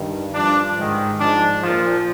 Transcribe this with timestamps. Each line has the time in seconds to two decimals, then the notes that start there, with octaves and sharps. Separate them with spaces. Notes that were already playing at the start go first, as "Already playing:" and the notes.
Already playing: G2 D#3
0.34 G2 F3 D4
0.77 G#2 D#3
1.19 G#2 F3 D4
1.62 A#2 F3